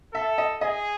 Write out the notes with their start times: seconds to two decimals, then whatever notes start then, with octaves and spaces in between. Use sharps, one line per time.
0.14 A4 E5
0.38 D#5
0.61 G#4 D#5